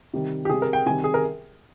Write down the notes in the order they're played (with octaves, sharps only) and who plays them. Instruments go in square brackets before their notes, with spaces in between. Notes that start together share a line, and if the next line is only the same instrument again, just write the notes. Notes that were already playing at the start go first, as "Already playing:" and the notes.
[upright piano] C3 D#3 G3
G4
C3 G3 G#4
A#4
G5
C3 D#3 G3 G#5
G#4
A#4